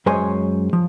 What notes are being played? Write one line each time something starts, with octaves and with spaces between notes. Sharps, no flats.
F#2 G#3 C5 C#5 G#5 C6
F3